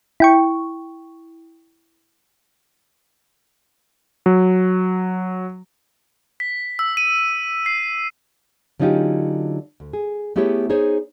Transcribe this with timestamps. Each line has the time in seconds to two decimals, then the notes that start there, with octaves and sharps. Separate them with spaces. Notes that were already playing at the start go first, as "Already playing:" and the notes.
0.20 E4 G5 C#6
4.26 F#3
6.40 B6
6.79 E6
6.97 D#7
7.66 C7
8.80 D3 F#3 C#4 D#4 F4 G4
9.80 D2
9.93 G#4
10.36 A3 B3 E4 G4 G#4 C#5
10.70 D#4 G#4 C5 C#5